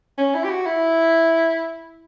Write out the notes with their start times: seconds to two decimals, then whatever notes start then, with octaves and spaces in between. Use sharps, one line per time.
0.18 C#4
0.34 E4
0.45 G4
0.50 F#4
0.66 E4